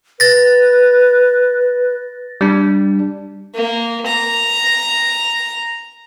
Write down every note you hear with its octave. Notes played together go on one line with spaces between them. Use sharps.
B4 A6 A#6
G3 D4
A#3
A#5